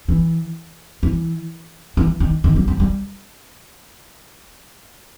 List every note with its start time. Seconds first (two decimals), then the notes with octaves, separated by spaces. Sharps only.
0.08 E3
1.03 E3
1.97 E3
2.20 D#3
2.44 D#3
2.56 F#3
2.68 G3
2.80 G3